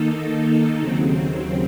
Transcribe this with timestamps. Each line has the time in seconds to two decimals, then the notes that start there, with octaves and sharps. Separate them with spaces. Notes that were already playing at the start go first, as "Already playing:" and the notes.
Already playing: D#3 A#3 D#4 A4
0.77 D#2 C#3 F#3 C4